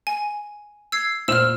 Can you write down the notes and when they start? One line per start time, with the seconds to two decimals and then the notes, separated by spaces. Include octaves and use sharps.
0.07 G#5
0.92 E6 G#6 C7
1.28 A#2 C5 E6 F6 E7